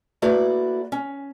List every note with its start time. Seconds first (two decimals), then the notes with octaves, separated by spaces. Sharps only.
0.22 A3 A#3 E4 F#4 B4 D5
0.92 C#4